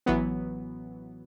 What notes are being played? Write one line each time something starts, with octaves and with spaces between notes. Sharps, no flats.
A1 E3 F#3 B3